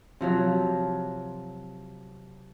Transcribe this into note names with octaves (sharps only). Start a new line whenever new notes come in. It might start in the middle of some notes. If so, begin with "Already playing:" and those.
C3 F3 F#3